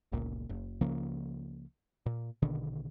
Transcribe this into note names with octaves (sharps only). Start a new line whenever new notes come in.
G1 C#2 A#2
F#1
C#2 C#3 F3 A#3
A#2
A#1 B2 D3 D#3